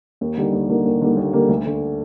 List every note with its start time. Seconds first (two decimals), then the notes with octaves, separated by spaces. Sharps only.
0.21 D#2
0.37 D3 G3 A#3 D#4
0.52 D#2
0.69 D3 G3 A#3 D#4
0.85 D#2
1.01 D3 G3 A#3 D#4
1.17 D#2
1.33 D3 G3 A#3 D#4
1.49 D2
1.65 D3 A3